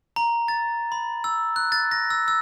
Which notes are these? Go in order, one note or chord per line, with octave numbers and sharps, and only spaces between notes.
A#5
A6
B5
E6
F#6
A6
A#6
E6
E6